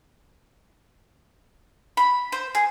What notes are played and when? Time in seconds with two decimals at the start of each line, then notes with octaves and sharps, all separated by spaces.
1.97 B5
2.32 C5
2.55 G#4